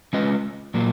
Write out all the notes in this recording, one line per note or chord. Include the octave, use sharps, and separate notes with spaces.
G#3 C#4 F4 B4 D#5
A#2 F#3 A#3 F4